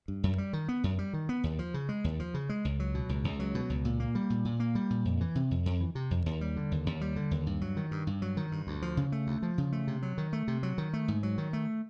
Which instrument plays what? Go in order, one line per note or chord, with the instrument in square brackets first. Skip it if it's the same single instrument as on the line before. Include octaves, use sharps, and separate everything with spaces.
[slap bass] G2
F#2
G3
D#3
B3
F#2
G3
D#3
B3
D#2
F3
C#3
G#3
D#2
F3
C#3
G#3
C#2
F#3
B2
C#2
C#2
F#3
B2
C#2
A#2
A#3
G3
A#2
A#2
A#3
G3
A#2
F2
E3
C3
F2
F2
E3
C3
F2
D#2
G3
D3
D#2
D#2
G3
D3
D#2
G2
F#3
D#3
G2
G2
F#3
D#3
G2
D2
F3
C#3
A3
D2
F3
C#3
A3
C3
F#3
D#3
A3
C3
F#3
D#3
A3
G#2
F#3
D#3
A3